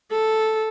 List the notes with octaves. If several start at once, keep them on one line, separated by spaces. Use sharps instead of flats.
A4